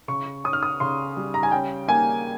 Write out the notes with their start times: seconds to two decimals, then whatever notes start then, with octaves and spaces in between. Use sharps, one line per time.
0.08 C#3 C#6
0.44 C#4 D#6
0.53 F6
0.63 D#6
0.80 C#3 C6
1.17 G3
1.34 A#5
1.43 G#5
1.52 C#4 G5
1.88 A#3 G#5